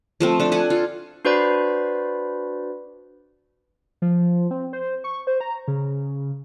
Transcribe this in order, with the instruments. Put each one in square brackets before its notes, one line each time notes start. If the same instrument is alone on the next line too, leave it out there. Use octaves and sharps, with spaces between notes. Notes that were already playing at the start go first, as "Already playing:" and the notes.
[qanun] F3 A3 C4
D4 A4
A4 F#5 G#5
F4
[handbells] D4 F#4 B4 C5 D5 B5
[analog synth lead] F3
C4
C5
C#6
C5
A#5
C#3